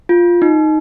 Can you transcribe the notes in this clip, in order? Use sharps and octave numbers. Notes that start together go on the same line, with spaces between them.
F4
D#4